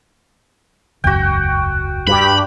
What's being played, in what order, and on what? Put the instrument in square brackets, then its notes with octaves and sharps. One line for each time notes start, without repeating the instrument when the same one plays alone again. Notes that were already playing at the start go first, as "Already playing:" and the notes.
[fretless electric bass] E1 C#2 F#2 [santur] F#4 G5
[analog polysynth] G2 G4 [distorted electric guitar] B5